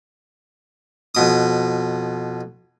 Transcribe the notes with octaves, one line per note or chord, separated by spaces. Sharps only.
F2 B2 D#6